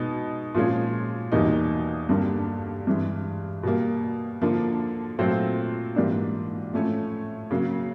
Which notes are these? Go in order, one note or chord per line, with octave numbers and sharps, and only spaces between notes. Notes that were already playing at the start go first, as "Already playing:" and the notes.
Already playing: B2 G#3 B3 D#4 G#4
A#2 F3 G#3 C#4
E2 B2 G3 A#3 D#4
G2 D3 G3 A#3
G2 E3 G#3
B2 G3 A#3
D3 F3 A#3
A#2 F#3 A3 C4 F4
G#2 E3 G3 A#3 D4
A2 F3 A3 C#4
C#3 F#3 A#3